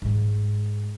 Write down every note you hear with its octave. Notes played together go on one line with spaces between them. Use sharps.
G#2 G#3